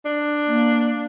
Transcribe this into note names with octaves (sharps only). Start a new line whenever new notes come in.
D4
A#3